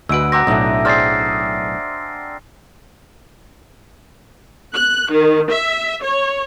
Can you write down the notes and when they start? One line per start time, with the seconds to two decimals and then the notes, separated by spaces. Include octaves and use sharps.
0.09 D2 F#4 B4 D#5 G#5 E6 D7
0.32 C4 F#5 A#5 D6 A#6
0.47 B1 A2 D4 D#5 E5 A5
0.85 G#4 C5 D5 F6 A6 C7
4.74 F#6
5.12 D#3
5.50 E5
6.02 C#5